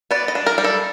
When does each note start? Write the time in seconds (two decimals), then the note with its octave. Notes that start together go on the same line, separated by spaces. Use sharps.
0.11 B3 D5
0.28 D#5
0.35 D4
0.46 A#4
0.58 G3
0.64 A4